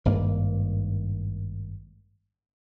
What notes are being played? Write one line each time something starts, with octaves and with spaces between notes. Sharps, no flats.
G#1 G2 A#3